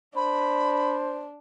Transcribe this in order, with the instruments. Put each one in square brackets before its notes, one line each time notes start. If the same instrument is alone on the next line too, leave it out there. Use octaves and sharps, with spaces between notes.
[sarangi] D4 [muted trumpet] C5 [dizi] B5